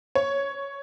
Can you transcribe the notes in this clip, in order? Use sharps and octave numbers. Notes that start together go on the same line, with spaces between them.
C#5